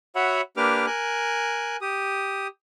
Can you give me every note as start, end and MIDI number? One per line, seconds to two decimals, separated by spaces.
0.16 0.41 66
0.16 0.41 73
0.16 0.41 76
0.16 0.41 78
0.16 0.41 83
0.57 0.86 58
0.57 0.86 62
0.57 0.86 67
0.57 0.86 71
0.57 0.86 86
0.57 0.86 89
0.86 1.77 70
0.86 1.77 80
0.86 1.77 90
1.81 2.47 67
1.81 2.47 87